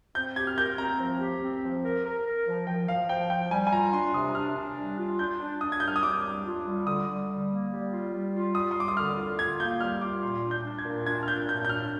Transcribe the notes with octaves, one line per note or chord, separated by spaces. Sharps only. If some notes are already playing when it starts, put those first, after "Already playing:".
C4 G6
G4 G#6
F6
A#4 G6
C4 A#5
F3
G4
C4
F3
A#4
A#4
A#4
F3
F3 G5
F3 F5
F3 G5
F3 G5
G3 G#5
G#5
F4 A#5
D4 C6
C3 D#6
D4 F6
D4
G3
F4
D4 G6
D4
D4 D#6
G#6
G3 G6
F6
D#6
G3 D6
D4
F4
G3
D3 D#6
G3
G3
A#3
G3
F4
G3
F4
G3 D#6
C6
G3 D6
D#6
D3 F6
F4
F4 G#6
A#3 G6
G3 F6
F4 D6
A#2 C6
D4
G6
D4
G#6
A#2
D4 G#6
F6
A#2 G6
A#2 G6
G6
D4 F6